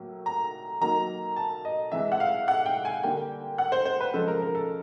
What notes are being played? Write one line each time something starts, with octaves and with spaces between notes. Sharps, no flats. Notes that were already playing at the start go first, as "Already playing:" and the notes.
Already playing: A2 F#3 A#3
A#5
D#3 F#3 A#3 A#5
A5
D#5
C3 E3 G#3 E5
F#5
F5
F#5
G5
G#5
D3 G3 A#3 G5
F#5
C5
C5
B4
C#3 F3 G#3 A4
A#4
A#4
A4